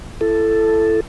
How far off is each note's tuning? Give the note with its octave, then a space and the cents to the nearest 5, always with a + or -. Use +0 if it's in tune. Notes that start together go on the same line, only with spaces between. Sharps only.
E4 +25 A4 +0